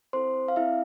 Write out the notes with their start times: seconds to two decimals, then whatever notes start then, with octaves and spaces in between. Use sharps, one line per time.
0.13 C4 E4 A4 C5 C6
0.48 F5
0.56 C4 E4 A4 E5